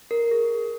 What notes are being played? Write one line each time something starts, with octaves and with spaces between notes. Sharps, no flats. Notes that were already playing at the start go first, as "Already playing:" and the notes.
A#4
G#4